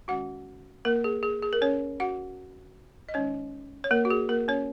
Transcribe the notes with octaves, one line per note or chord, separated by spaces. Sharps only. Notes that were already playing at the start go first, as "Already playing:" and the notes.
D#3 G#3 C#4 F#4 F#5
A#3 A#4
G#4
G#4
G#4
A#4
C#4 C#5
F#4 F#5
D#5
D#3 G#3 C#4 D#4 C#5
C#5
A#3 A#4
F#4
G#4
A#3 A#4
C#4 C#5